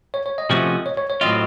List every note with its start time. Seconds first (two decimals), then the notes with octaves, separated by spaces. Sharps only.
0.14 C#5
0.26 C#5
0.38 D#5
0.50 C3 F3 A3 C#4 F#4
0.86 C#5
0.97 C#5
1.10 C#5
1.21 A2 F#3 C4 F4 D#5